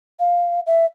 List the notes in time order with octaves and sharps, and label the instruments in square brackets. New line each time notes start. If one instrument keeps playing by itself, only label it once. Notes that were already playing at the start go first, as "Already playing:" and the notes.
[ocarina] F5
E5